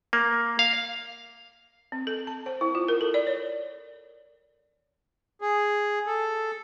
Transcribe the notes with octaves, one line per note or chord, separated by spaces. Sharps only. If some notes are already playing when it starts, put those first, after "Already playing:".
A#3
F5
C4
A4
A5
C5
E4
F4
A#4
A4
D5
C#5
G#4
A4